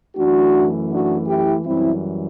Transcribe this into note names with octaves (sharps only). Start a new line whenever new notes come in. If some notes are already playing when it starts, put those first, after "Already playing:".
F#2 E3 A3 D4 F#4
D4 F#4
E4 G4
F#2 E3 G3 C4 E4